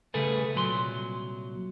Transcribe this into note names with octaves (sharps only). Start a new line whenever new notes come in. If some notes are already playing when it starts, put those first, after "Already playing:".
C#3 G3 A3 G#4 A4 B4
C2 A#2 F#3 B5 C6